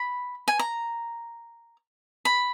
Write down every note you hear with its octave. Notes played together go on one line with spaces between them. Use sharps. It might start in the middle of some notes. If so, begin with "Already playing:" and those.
Already playing: B5
G#5
A#5
B5